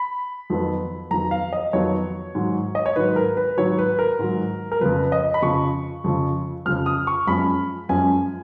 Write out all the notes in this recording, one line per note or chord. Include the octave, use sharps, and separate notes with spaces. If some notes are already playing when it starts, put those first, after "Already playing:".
Already playing: B5
F2 D#3 F#3 B3
F2 D#3 F#3 B3 A#5
F5
D#5
F2 D#3 F#3 B3 C#5
G#2 D#3 F#3
D#5
C#5
G#2 D#3 F#3 B4
A#4
B4
G#2 D#3 F#3 C#5
B4
A#4
G#2 D#3 F#3
A#4
F2 C#3 F3 B4
D#5
B5
F2 C#3 F3 C#6
F2 C#3 F3
F2 C#3 F3 F6
D#6
C#6
F#2 F3 G#3 C#4 B5
F#2 F3 G#3 C#4 G#5